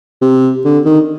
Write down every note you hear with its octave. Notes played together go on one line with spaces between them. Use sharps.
C3
D3
D#3